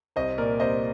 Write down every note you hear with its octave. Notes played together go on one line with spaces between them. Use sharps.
C2 C5 D#5
A#2 A#4 D5
C2 C5 D#5